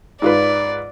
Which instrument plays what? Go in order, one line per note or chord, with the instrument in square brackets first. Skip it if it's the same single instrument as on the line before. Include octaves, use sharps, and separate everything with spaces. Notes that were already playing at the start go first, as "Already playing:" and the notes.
[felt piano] G#2 F4 B4 [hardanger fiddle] D5